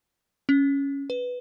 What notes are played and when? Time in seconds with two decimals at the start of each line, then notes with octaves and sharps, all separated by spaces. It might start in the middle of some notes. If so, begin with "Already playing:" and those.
0.49 C#4
1.10 B4